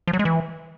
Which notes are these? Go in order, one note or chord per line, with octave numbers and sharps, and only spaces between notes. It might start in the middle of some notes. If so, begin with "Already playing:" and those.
F3
F#3
G#3
E3